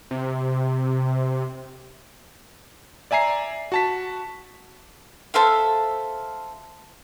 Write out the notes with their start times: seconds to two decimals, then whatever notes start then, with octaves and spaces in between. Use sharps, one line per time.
0.11 C3
3.11 D5 E5 G#5 A#5 C7
3.72 F#4 A5 B6
5.34 A4 C5 E5 F5